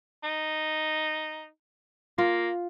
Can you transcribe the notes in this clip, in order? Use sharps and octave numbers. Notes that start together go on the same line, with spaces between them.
D#4
A#3 F4